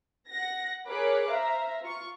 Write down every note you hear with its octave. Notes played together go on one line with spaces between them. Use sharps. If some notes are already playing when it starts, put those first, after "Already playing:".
F#5 A#6
G#4 A#4 C#5 B5 D6 F#6
C5 E5 F5 A#5
F4 C#6